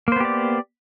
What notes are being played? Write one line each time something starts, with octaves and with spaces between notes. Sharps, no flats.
A#3 B3 G4 C5 D5